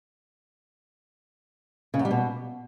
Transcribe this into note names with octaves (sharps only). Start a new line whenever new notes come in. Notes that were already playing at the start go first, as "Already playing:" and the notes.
C#3
F#2
G3
B2